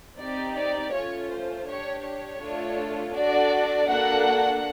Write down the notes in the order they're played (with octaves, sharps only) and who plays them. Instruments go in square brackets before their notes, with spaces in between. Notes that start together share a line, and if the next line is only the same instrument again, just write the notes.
[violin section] C4 D#4 G4 D5
D5
A3 C#4 F4 C#5
C5
D4 G4 C#5
C#5
A3 D4 F4 A4
D4 F#4 A4 D5
A#3 D4 F#4 A4 F#5